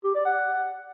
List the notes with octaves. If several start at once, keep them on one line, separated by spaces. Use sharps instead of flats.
G4
D5
F#5